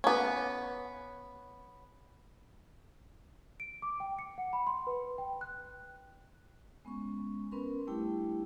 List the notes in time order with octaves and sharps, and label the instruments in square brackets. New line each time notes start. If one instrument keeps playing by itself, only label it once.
[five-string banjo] B3 C#4
[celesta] D7
D6
G5
C#7
F#5
B5
C6
B4
G5
F#6
[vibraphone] G#3 B3 C#4 C#6
B3 C#4 A#4 B4 C6
G3 A3 D4 E4 G4 G5